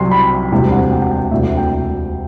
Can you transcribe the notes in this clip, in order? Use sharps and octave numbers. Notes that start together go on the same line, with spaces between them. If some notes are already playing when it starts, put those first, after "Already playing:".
Already playing: C2 C3 F#3 C6
B5
E1 D2 C3 G3
F#5
G5
F#5
G5
E1 D2 C3 E5
G5